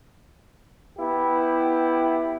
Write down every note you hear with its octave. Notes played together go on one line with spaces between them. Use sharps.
B3 E4 G4